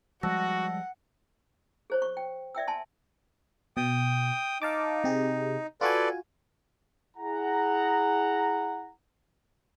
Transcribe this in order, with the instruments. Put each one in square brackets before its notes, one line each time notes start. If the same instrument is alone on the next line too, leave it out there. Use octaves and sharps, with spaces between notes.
[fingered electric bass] F3 G3 G#3 [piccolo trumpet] F#4 [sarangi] F#5 [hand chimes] A5 E6 A#6
[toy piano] G#4 C5 C#5
C#6
G5
D5 E5 G5 E6
G#5 A5 C6
[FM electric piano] B2 [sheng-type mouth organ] G5 D#6
[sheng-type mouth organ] D#4 [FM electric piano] F5 A5 D6
[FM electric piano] C3 G4 G#4
[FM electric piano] F4 F#4 G#5 [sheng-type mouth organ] A4 B4 D5
[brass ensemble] E4 G#4 F#5 A#5